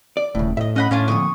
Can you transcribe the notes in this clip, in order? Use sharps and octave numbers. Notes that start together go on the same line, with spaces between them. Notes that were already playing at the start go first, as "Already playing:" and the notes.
D5
D#1 A2 C#3
A2 D#5 E5
C#4 D#5 F#5 B5
A2 C#4 D4 F4 C#5
F2 A#2 D3 C#6 D#6